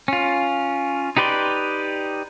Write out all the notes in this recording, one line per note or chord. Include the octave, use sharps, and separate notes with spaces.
C#4 F4
D#4 G4 B4 D5 C6